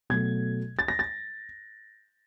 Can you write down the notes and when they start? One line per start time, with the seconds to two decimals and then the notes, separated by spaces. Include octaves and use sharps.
0.10 B2 F#3 A3 G#6
0.79 A6
0.88 A#6
0.99 A6